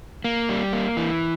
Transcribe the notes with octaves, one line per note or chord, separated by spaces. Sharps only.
A#3
G3
A#3
E3